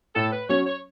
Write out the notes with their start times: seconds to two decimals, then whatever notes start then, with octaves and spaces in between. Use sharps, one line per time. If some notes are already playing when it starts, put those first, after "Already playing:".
0.16 A2 A4
0.33 B4
0.49 F#3 C#4 C#5
0.66 C#5